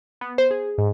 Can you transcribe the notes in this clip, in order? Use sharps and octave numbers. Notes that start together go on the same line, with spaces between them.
B3
C5
G#4
G#2